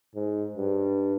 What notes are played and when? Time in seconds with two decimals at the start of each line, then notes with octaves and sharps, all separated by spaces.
0.15 G#2
0.57 G2